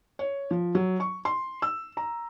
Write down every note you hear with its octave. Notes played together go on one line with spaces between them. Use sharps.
C#5
F3
F#3
C#6
C6
E6
A#5